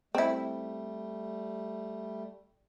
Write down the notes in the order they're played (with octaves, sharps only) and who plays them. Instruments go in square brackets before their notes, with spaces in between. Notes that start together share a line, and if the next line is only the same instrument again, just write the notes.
[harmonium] G3 A3 [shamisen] C4 E4